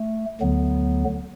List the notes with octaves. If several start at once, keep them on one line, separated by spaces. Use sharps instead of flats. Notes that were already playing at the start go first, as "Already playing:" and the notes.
Already playing: A3
D2 D3 F#3 B3